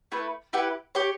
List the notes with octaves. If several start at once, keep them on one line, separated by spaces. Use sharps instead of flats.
A3 E4 B4
E4 G4 B4 F#5
G4 C#5 G5